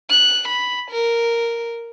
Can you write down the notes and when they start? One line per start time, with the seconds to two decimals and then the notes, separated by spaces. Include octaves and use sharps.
0.10 F#6
0.48 B5
0.91 A#4